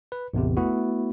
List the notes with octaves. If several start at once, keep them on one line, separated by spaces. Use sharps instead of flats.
B4
A1 E2 C3
A3 B3 E4 F#4